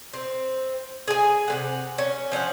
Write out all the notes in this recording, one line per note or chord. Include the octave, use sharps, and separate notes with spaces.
C4
G#4 G#5
C3 G#3 F#5
C#4
F3 C#4 E5 F#5